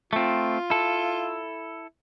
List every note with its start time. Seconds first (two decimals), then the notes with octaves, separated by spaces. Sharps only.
0.13 A3 C4 F4
0.70 E4 A4